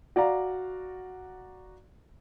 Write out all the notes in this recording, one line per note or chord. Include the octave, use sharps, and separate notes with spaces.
F#4 D5 F5 A#5